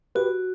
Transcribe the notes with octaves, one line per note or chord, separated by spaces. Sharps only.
F#4 G4 B4